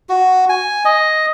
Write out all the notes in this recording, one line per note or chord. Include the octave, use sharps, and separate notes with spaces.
F#4
G#5
D#5